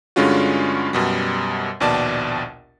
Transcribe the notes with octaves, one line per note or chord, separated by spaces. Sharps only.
G2 D3 G#3 C#4 F4 F#4
F#2 B2 G3
A#1 D#2 B2 D5 A5